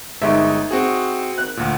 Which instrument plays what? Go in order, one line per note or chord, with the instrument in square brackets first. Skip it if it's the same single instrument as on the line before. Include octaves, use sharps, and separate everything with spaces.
[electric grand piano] G1 G#3 C#6 [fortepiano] D#4 E5
[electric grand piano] C4 F#4 G#4
[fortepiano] F#6
[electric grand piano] D2 A#2